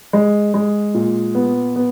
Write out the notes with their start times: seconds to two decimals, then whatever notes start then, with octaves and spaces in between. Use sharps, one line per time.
0.13 G#3
0.54 G#3
0.94 A#2
1.35 B3
1.76 B3